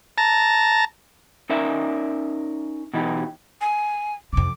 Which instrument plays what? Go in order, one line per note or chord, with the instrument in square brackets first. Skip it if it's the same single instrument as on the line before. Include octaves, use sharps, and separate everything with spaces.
[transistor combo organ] A5 A#5
[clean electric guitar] C#4 D#4 A#4 D5 E5
B2 E3 D#4 G4
[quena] G#5
[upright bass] F2 C3 [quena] D6